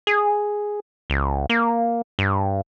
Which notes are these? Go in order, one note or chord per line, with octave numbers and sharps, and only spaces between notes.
G#4
C#2
A#3
G2